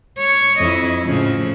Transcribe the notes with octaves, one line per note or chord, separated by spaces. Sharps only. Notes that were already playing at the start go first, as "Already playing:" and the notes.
C#5
F2 E4 D#5
A2 C#3 F3